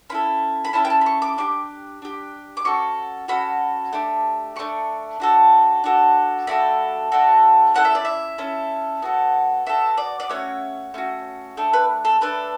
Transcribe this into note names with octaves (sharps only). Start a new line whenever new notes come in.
C#4 E4 A4 B5
B5
C#4 E4 A4 A5
G5
A5
B5
C#6
D6
D4 G4 D6
D4 G4
D6
C#4 F#4 A4 C#6
C#4 F#4 A4 B5
A3 D4 G4
A3 D4 G4 C#6
D4 F#4 A4
D4 F#4 A4
A3 D4 F#4 A4 B5
A3 D4 F#4 A4
C#4 E4 A4 F#5
E5
D5
E5
C#4 E4 A4
B3 F#4 A4
B3 F#4 A4 E5
D5
D5
A3 C#4 F#4 C#5
A3 C#4 F#4
A3 D4 A4
B4
A4
A3 D4 A4 B4